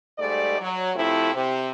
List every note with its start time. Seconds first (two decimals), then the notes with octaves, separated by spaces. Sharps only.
0.19 G#2 G3 A3 D5
0.60 F#3
0.96 C3 F3 A3 E4
1.35 C3